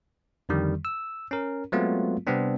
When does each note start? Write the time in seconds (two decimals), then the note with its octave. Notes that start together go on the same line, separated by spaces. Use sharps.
0.49 F2 D3 D#3 G3
0.85 E6
1.31 C#4 A#4
1.72 F#3 G#3 A3 B3 C4 F4
2.27 C3 G3 B3 C4 D4